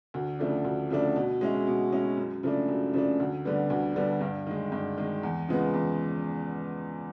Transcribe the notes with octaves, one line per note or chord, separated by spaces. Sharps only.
D2
C#3 F3 A3 D4
D2
C#3 F3 A3 D4
B2
G#3 C#4 E4
B2
G#3 C#4 E4
F#2
C#3 F3 A3 D4
F#2
C#3 F3 A3 D4
D2
D3 G3 B3
D2
D3 G3 B3
G2
D#3 G#3
G2
D#3 G#3
E2
C#3 F3 G#3 B3
E2